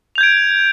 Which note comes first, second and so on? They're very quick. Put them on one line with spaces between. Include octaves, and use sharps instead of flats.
F7 G6 G#6 D7